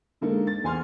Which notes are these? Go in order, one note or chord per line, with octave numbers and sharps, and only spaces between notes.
D3 G#3 A#3 D#4 A4
A6
E2 G#5 C6 F6